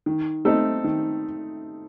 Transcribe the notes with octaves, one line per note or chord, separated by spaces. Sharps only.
D#3
A3 C4 D#4 A4
D#3